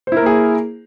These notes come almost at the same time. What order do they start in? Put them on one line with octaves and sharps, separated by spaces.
C5 E4 A#4 A#3 G#4